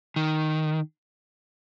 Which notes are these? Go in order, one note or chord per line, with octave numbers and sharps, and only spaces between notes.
D#3